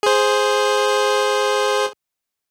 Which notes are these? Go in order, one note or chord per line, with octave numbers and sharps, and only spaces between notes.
G#4 C5